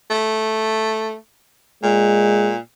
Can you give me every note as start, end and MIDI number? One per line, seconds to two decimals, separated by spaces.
0.11 1.16 57
1.83 2.58 46
1.83 2.53 56